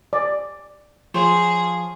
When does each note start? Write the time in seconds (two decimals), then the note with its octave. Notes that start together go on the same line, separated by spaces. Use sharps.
0.13 D5
1.14 F3 G#4 C5 C#5